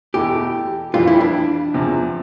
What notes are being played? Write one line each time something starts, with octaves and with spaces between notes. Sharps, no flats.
E2 B2 A3 E4 G4 A4
F2 E3 G3 F4
E4
D4
E2 C3 F3